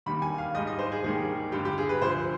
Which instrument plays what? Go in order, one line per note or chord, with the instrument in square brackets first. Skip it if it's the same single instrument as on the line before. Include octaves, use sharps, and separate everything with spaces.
[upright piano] D#2 D#3 G3 B5
G#5
F5
G#2 D#5
G3
D#5
C5
G#4
D#2 D#3 G3 G#4
G2 D3 G3 G4
G4
G#4
B4
D2 D3 F3 C5